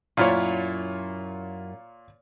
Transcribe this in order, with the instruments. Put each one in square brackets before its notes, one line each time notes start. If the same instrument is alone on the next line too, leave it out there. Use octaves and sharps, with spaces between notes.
[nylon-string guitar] F#2 E4 [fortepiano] A#2 F4 C#5